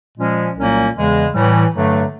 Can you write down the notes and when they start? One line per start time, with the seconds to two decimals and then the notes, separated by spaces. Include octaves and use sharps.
0.18 A#2 F3 G#3 C#4
0.57 C2 A#2 F#3 A#3 C#4
0.96 E2 C#3 E3 G#3
1.34 A2 E3 G3
1.73 G2 D3 F#3 A3